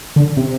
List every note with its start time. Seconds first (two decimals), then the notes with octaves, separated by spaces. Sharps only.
0.16 D3
0.37 C3